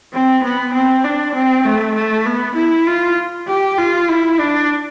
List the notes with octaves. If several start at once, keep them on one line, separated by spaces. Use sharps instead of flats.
C4
B3
C4
D4
C4
A3
A3
B3
E4
F4
G4
F4
E4
D4